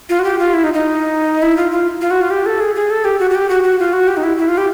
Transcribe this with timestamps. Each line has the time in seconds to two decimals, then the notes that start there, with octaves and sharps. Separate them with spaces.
0.09 F4
0.19 F#4
0.24 G4
0.39 F4
0.54 E4
0.64 D#4
0.74 D#4
1.42 E4
1.57 F4
1.72 F4
2.01 F4
2.11 F#4
2.21 F4
2.30 G4
2.46 A4
2.60 G#4
2.75 G#4
2.91 A4
3.05 G4
3.20 F#4
3.31 F#4
3.35 G4
3.49 F#4
3.63 F#4
3.79 F4
3.93 F#4
4.08 G4
4.17 D#4
4.23 E4
4.38 E4
4.48 F4
4.58 G4